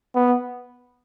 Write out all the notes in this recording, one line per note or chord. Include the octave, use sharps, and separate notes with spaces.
B3